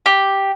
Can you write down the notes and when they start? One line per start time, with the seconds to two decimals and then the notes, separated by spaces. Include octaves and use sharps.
0.06 G4